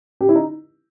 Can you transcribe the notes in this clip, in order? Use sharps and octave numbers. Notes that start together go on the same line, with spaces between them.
G4
E4
D#4